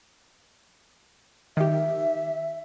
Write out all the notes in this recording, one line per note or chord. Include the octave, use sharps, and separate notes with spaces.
D#3 G4 E5